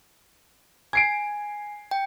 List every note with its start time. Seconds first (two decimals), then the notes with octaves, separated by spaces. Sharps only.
0.93 G#5 G#6 C7 D7
1.91 G5